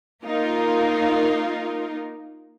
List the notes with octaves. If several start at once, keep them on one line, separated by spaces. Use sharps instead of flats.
A#3 D#4 F4 A#4